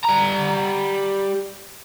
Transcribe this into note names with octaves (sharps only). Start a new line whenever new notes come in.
G3 A#5